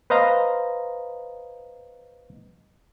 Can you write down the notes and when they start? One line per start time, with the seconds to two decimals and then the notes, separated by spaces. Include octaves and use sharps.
0.10 B4 C5 D#5 F5 A#5